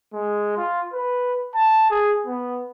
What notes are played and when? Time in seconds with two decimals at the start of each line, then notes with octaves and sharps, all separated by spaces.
0.13 G#3
0.57 F4
0.93 B4
1.55 A5
1.91 G#4
2.26 B3